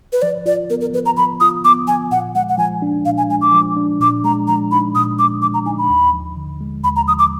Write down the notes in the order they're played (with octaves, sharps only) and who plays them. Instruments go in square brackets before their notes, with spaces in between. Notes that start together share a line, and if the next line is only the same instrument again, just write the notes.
[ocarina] B4
[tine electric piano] F3 [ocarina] D5
[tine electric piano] F4 [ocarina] D5
[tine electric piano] B3 [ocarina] A#4
[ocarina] A#4
[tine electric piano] F3 [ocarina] B4
[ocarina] A#5
[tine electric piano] F3 [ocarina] B5
[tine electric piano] F4 [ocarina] D#6
[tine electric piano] B3 [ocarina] D6
[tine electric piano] F3 [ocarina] G#5
[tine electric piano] A#2 [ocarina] F#5
[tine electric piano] G#3 [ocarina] F#5
[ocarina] F#5
[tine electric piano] F3 [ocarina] G#5
[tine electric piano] D4
[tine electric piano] A#2 [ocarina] F5
[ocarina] G#5
[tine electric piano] G#3 [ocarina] G#5
[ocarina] D6
[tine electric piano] F3
D4
[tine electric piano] A#2 [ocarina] D6
[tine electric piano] G#3 [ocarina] A#5
[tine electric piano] F3 [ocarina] A#5
[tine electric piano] D#4 [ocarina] B5
[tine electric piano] A#2 [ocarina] D#6
[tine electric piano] G#3 [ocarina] D6
[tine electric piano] F3 [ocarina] D6
[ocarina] A#5
[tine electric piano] D#4 [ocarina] G#5
[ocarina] B5
[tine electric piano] D#2
F3
D3
G#3
[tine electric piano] D#2 [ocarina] B5
[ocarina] A#5
[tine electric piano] F3 [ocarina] D#6
[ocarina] D6